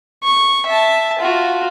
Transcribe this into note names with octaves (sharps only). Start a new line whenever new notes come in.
C#6
E5 A5
F4 F#4